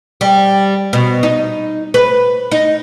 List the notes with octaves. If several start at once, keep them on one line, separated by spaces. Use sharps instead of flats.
G3
B2
D#4
B4
D#4